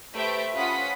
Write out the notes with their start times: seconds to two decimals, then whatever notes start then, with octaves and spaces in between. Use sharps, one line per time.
0.14 A3 G4 B4 C5 E5 D7
0.55 C#4 F4 F#5 B5 D#6 B6